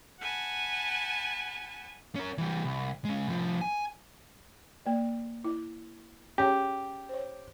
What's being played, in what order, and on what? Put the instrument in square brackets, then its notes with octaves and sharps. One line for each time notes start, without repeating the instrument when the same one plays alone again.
[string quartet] F#5 G#5 A5 B5
[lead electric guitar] C#4 A#4
E3 G3
C2
G#3 C#4
C2 F3
G#5
[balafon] A#3 D5
E4
[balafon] C#4 G#4 C#5 [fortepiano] G4
[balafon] C5 C#5